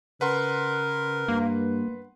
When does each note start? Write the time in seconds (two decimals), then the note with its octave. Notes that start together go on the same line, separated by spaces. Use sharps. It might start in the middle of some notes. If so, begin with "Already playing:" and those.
0.21 C#3 A#4 B4 F#5 C6
1.28 G2 A#3